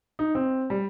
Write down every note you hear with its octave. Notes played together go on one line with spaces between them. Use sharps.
D#4
C4
G3